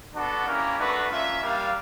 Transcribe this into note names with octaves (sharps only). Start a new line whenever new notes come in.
B3 D4 F#4 A4
A#3 C#4 E4 G4 A#4
A3 D4 F#4 B4
A#3 C#4 F4 E5
G3 A#3 D4 F5